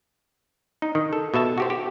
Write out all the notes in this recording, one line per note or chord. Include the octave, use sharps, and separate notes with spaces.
D#4
D#3
A4
B2 A4 E5 A5
F#4 G4 C5
G4